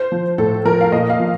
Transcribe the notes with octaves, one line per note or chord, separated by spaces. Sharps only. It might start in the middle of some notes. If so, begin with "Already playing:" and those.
Already playing: C5
F3
A2 A4
F3 A#4
F5
A#2 D#5
F5
F3